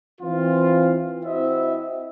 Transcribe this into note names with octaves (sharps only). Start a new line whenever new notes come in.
E3 C4 F4
C4 E4 F#4 C5 D#5 E5